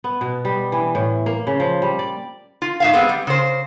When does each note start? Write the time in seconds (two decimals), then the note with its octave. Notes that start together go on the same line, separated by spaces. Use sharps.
0.04 B3
0.21 B2
0.45 G3
0.72 E3
0.95 A2
1.26 A#3
1.47 C#3
1.60 F3
1.82 G3
1.99 D5
2.62 F4
2.80 G#2 E5 F5
2.93 G3 G#3 B3 C4
3.09 G3
3.27 C#3 C5